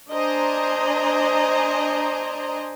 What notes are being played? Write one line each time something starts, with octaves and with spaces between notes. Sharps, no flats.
D4 C5 D#5 G#5 A#5